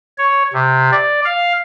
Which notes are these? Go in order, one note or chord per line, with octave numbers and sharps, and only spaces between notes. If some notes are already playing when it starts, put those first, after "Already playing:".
C#5
C3
D5
F5